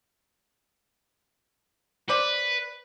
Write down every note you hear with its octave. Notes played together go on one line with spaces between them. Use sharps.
B4 C5 D5